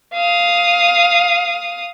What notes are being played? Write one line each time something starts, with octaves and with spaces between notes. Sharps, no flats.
F5 D#6